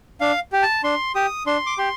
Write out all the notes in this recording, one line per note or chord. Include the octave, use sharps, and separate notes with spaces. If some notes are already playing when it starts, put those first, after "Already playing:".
D4 F5
G4
A5
D4 C6
G4 D#6
D4 C6
D6
G4 C6